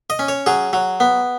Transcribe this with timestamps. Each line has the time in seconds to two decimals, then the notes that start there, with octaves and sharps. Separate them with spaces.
0.10 D#5
0.19 C#4
0.28 C#5
0.46 F#3 G#4
0.73 F#3
1.00 B3